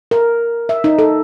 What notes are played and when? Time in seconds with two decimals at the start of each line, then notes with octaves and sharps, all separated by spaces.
0.11 A#4
0.69 E5
0.84 D#4
0.99 A4